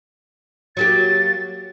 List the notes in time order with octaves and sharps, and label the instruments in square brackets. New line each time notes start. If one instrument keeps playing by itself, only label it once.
[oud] F#3 A#3 G4 [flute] A6